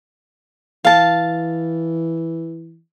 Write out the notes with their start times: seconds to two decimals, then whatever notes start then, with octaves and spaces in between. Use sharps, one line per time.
0.85 E3 F5 A5